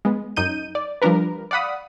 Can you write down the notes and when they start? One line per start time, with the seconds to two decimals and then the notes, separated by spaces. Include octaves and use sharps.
0.05 G#3 B3
0.37 F#2 D#4 G6 D#7
0.75 D5
1.02 F3 G3 D4 A#4 B4
1.51 D5 F5 F#5 B5 D#6